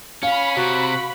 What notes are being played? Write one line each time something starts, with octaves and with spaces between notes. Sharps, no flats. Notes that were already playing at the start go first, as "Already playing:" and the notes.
C#4 F5 B5
C3 F#4